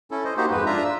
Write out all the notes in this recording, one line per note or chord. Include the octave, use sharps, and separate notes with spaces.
C#4 E4 A4
C5 D#5
A#3 D#4 F#4 G4 C5
F2 G#2 G#3 B4
D4 F4 E5 A#5
E6